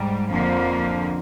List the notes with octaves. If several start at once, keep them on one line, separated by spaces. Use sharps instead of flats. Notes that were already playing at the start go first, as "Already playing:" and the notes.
Already playing: G#2 G3
F2 D3 F3 A#3